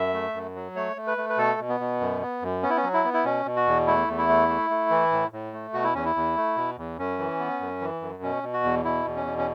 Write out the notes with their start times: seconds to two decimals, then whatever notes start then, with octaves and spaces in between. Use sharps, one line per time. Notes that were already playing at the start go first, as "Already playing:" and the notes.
Already playing: F#2 E5
0.14 A3
0.34 F#2
0.55 F#3
0.76 A3 C#5
0.97 A3
1.07 B4
1.18 A3
1.29 B4
1.38 B2 A4
1.59 B2
1.69 B3
1.80 B2
2.00 F#2
2.22 B3
2.42 F#2
2.63 B3 C#4
2.70 E4
2.77 C#4
2.84 F#3
2.94 E4
3.05 B3
3.14 E4
3.25 B2 C#4
3.45 B2
3.56 F#4
3.67 E2
3.87 A3 E4
4.08 E2
4.18 E4
4.29 A3
4.49 A3
4.70 A3
4.90 E3
5.12 A2
5.33 A2
5.53 A3
5.74 B2 F#4
5.84 E4
5.94 E2 C#4
6.05 E4
6.15 E2
6.36 A3
6.56 B2
6.77 E2
6.98 F#2 C#4
7.19 E3
7.40 B3
7.60 F#2
7.81 E3
8.01 F#2
8.23 B2 C#4
8.43 B2
8.53 F#4
8.64 E2
8.85 B2 E4
9.06 E2
9.16 C#4
9.26 B2
9.38 C#4